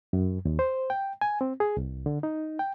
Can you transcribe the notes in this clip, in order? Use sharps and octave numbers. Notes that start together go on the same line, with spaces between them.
F#2
D#2
C5
G5
G#5
C4
G#4
C2
D3
D#4
G5